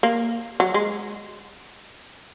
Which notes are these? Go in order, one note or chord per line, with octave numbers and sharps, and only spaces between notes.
A#3
F#3
G#3